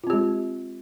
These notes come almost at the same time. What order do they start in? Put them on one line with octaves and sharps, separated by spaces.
F4 C4 G4 G#3